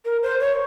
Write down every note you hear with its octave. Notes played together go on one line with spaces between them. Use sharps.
A#4
C5
C#5